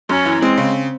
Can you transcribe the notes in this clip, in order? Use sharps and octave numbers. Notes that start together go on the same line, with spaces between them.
F#2 C#4
E3
G#3 C4
C#3